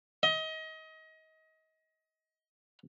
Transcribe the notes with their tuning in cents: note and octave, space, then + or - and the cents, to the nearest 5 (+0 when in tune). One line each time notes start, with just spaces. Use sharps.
D#5 +30